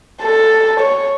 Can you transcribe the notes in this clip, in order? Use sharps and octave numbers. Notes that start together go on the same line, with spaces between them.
A4
C#5